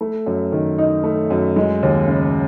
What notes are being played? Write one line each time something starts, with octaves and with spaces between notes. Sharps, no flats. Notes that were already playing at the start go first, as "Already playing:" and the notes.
A3
F#2
D#3
D#4
A3
F#2
G#3
D#2
C#3